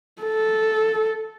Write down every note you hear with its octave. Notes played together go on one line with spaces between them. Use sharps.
A4